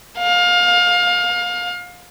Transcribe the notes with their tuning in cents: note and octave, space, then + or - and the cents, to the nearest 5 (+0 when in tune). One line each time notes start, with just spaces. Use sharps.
F5 +25